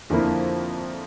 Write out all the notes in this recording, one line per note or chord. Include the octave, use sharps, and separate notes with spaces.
F2 D3 F3 A#3 E4